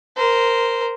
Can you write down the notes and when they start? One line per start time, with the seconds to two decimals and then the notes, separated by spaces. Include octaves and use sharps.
0.17 A#4 C5